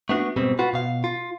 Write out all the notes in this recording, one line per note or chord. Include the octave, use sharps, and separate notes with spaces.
A3 B3 D4 F#4
G#2 B2 G3 C4
F4 F#4 B4
B2 F5
F4